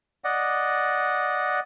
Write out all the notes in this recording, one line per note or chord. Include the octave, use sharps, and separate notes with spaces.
D5 D#5 F#5